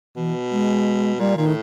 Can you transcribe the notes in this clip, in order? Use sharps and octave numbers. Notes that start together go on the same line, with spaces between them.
B2 E3
G#3
A#2 G3
A#2 D#3
A2